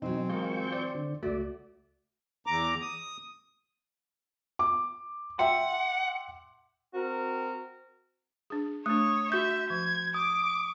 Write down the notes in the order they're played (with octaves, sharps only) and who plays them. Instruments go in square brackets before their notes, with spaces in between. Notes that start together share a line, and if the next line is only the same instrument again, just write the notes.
[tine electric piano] B2 [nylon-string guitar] E3 F#3 [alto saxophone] C4 [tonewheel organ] D#4
[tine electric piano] G#3 G#4 A#4 [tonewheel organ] F4 C#6 G6
[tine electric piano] C5 D5
[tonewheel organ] D3
[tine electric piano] C#2 A3 [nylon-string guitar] F#4 [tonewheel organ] D5
[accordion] E2 A#5 D6
D#6
[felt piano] D6
[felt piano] E5 G5 C6 [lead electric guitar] F#5
[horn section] C4 F#4 A#4
[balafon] D4 G#4
[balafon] A3 D4 [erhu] C#5 [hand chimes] D#6
[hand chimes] F#4 G6 [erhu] E5 [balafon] C#6
[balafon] F3 [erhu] G#6
[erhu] D6 [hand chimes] D#6